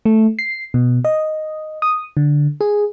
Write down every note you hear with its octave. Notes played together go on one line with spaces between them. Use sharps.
A3
C7
B2
D#5
D#6
D3
G#4